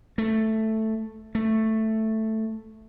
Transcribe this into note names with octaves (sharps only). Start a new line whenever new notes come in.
A3
A3